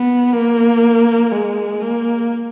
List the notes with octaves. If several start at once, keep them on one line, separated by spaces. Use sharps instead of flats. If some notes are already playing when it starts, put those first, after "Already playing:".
Already playing: B3
A#3
G#3
A#3